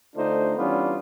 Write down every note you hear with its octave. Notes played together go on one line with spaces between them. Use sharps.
D3 A3 D4 D#4 F4 C5
E3 G3 B3 C#4 D4 F4